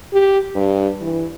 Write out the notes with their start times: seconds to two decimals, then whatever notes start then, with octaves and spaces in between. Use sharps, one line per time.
0.13 G4
0.55 G2
1.01 E3